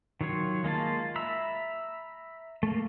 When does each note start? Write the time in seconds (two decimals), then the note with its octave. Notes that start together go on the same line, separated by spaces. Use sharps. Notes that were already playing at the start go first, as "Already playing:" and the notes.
0.21 D#3 F#3 F4 C#5
0.64 G#3 A#3 F4 A5
1.16 E5 A#5 B5 E6
2.63 A3 A#3